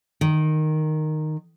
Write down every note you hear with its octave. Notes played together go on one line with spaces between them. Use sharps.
D#3